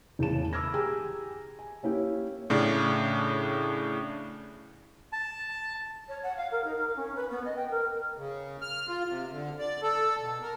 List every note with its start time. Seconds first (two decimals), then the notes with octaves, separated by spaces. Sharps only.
0.19 E1 E2 A2 C#3 A5 E7
0.53 B5 D6 E6 F6 G#6 A#6
0.74 G4 G#4 G5 G#5 A#5 E6
1.59 G#5
1.83 A#3 C#4 E4 G4
2.50 A2 C#3 D4
5.12 A5
6.08 C#5
6.23 F#5
6.36 F5
6.51 A#4
6.64 D#4
6.77 A#4
6.95 C#4
7.15 B4
7.30 B3
7.44 D#5
7.56 G5
7.70 A#4
8.17 C#3
8.62 F6
8.88 F4
9.07 C3
9.31 D3
9.59 D5
9.82 A4
10.20 B2
10.42 A#4